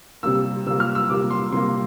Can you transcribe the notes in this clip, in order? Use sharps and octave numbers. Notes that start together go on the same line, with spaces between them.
C3 G3 A#3 E6
C3 G3 A#3 E6
F6
E6
C3 G3 A#3 D6
C6
C3 G3 A#3 C6